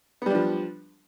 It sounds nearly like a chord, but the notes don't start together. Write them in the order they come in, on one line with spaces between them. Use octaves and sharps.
B3 G3 D4 F3